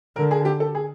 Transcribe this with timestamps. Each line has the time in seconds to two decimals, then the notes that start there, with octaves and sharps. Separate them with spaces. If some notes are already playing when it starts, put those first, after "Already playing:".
0.16 D3 A#4
0.31 G#4
0.45 G4
0.60 A4
0.75 G#4